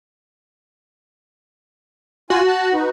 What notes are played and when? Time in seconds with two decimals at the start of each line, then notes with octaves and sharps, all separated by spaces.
2.30 F4 F#4 G#5
2.47 A5 F#6
2.73 D#4 F#4 B4